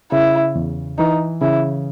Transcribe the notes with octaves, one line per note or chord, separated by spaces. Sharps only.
C#3 E4
E2
E3 D#4
C#3 E4